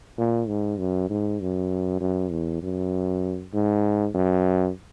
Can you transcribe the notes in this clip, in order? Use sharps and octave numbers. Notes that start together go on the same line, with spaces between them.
A#2
G#2
F#2
G#2
F#2
F#2
E2
F#2
G#2
F#2